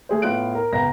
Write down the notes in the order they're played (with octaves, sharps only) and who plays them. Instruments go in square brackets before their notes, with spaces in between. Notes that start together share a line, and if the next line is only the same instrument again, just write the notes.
[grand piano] A3 G#4 C5
A2 B3 F4 F#6 D7
A#4
C#2 B3 A#5 A#6